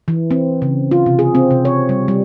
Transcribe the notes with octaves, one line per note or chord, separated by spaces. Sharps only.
E3
C4
C#3
F4
C3
G#4
C4
C3
C#5
G3
G3